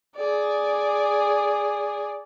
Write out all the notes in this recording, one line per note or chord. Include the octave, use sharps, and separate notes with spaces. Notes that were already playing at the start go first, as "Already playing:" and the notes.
G#4 D5